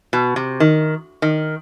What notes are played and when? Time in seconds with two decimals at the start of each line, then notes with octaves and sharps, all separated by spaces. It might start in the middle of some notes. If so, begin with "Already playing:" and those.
0.13 B2
0.36 C3
0.60 D#3
1.22 D#3